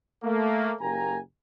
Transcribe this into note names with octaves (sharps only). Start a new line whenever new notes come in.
A3 A#3
F#1 A#3 G4 G#5 A#5